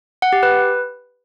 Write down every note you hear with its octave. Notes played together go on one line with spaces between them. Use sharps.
F#5
G4
B4